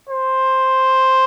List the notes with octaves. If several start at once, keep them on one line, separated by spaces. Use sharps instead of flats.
C5